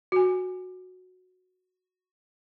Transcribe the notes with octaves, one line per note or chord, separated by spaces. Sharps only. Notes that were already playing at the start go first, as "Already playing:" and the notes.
F#4 G#5